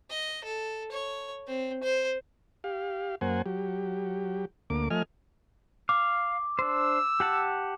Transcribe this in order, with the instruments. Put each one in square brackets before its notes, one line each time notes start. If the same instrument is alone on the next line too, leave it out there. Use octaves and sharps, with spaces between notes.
[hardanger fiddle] D#5
A4
C#5
C4
C5
[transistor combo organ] G4 F5
F#2 A#3 C5 F#5 G#5
F#3 G4
D2 A#3 D6
F3 A3 D#5 G#5 F6
[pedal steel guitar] F5 [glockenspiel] D6
[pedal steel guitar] D4 C5 [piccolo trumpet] E6
[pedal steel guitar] G4 F#5 A5